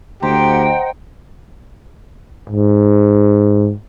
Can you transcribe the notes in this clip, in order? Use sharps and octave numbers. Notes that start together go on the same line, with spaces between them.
D2 G4 C5 D#5 F#5 G5 A#5 C6
G#2